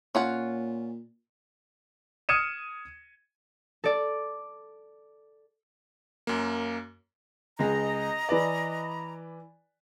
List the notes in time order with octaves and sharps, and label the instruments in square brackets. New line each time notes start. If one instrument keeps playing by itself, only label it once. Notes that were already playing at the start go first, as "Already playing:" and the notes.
[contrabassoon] A#2 [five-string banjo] C#4 F4 F#5
[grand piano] D#6 F6 G#6 C#7 D#7 E7
[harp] A4 D5
[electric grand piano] F#2 A#3
[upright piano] C#2 G#3 [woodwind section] D#5 A#5
[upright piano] E3 B4 D5